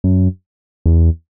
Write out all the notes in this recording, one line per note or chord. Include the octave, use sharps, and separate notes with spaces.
F#2
E2